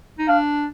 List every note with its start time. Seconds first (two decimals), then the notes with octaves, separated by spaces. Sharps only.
0.18 D#4
0.28 D4 F5